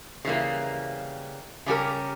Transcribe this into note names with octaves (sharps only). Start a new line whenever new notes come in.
C#3 E3 G3 A#3
C#3 G3 C#4 G4 A#4